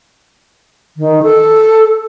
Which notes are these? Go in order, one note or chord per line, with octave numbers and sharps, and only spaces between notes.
D#3
A4